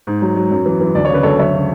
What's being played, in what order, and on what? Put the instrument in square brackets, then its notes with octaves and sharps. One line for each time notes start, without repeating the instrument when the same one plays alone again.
[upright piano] G#2
F#3
F#3
F#2
E3
E3
D2 D5
C#5
C#3 B4
D2 A4 C#5
F#2 C#5 E5
C#3